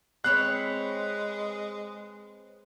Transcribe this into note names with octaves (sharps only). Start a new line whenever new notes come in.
G#3 C4 B4 C#5 F#6